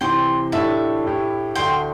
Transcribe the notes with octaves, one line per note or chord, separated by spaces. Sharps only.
C3 E3 C4 G5 C6
A2 A3 D4 G4 E5 A5
A2 A3 E4 G4
D2 D3 A3 G5 C6